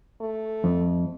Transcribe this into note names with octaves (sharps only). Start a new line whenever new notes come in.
A3
F2